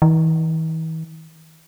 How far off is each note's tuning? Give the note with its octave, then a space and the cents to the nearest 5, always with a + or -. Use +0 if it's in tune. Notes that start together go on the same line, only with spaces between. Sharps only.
E3 -45